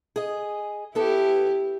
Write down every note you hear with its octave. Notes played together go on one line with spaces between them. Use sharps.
G#4 D#5
B3 E4 G4 A4